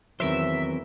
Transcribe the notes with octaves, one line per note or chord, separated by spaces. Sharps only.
E2 D#3 E3 F#3 C4 A#4 C5 E5